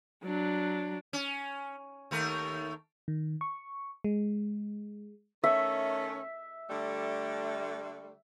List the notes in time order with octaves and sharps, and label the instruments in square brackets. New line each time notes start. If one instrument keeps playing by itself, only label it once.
[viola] F#3 D4
[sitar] C#4
D#2 A3 A#4
[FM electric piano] D#3
C#6
G#3
[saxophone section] D#3 A3 C#4 [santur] E5
[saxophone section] D3 G3 A3